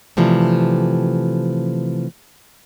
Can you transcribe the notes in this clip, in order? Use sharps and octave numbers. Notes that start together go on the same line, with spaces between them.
C3 E3 F3 G3 A3